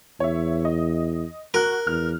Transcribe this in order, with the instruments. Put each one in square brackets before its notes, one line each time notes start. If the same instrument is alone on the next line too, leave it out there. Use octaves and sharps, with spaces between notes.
[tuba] E2 [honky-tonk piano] C#5 E5
[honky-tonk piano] D#5
[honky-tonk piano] F#4 F#6 [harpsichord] A#4
[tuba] E2 [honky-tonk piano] F6